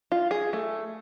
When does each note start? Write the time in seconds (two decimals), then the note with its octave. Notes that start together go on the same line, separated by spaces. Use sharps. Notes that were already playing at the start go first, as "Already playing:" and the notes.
0.12 F4
0.31 G#4
0.53 A3